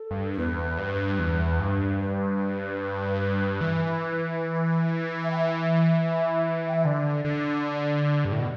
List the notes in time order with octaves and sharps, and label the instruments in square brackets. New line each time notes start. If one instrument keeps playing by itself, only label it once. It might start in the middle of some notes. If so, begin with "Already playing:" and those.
Already playing: [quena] A4
[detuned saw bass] G2
[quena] A4
[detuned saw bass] E2 [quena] B4
[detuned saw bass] G2
E2
G2
[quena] B4
[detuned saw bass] E3
[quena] E5
G5
E5
G5
E5
[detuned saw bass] D3 [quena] D5
[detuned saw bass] D3
G2
A2
B2